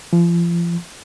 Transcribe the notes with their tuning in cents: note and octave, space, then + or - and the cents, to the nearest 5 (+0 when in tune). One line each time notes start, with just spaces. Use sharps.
F3 -35